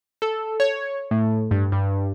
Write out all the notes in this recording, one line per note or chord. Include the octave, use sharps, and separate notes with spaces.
A4
C#5
A2
G2
G2